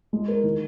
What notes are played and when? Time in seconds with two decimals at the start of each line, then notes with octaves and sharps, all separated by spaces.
0.13 G#3
0.28 A#4
0.44 D#3